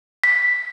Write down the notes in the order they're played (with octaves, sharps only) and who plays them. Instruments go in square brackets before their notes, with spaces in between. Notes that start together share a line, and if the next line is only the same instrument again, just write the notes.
[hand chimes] B6